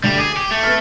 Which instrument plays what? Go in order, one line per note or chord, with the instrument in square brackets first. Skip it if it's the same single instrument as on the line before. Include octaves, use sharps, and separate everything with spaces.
[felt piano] D2 [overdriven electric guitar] G3 G4
[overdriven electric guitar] G#4 [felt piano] D6
[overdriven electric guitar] G4
A3
[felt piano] B3 F6